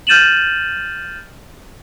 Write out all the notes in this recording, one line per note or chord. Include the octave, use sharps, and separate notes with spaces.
F6 G6 A6 D#7 E7 F#7